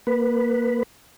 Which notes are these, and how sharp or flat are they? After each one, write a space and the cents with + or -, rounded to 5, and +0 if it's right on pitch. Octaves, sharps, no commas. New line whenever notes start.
A#3 +0 B4 +0